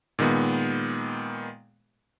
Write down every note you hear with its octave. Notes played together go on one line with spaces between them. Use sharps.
A#2 D#3 G#3 B3